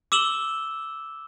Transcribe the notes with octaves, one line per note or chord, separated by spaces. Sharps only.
D6 E6 E7 F#7 G7